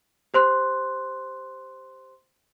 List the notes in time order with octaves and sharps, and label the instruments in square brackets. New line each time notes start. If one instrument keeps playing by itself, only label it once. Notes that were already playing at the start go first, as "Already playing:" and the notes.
[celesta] G4 C5 C6 F#6